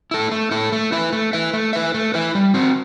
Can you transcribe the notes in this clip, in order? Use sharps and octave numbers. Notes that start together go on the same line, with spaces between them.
E4 A4
A3
E4 A4
A3
E4 B4 E5
A3
E4 B4 E5
A3
E4 B4 E5
A3
E4 B4 E5
G3
C4 F#4